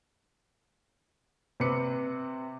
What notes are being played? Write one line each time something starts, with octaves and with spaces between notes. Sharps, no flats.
C3 C4 B4 D6 C#7